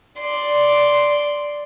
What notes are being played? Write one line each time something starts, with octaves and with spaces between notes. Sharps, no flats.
D5 C6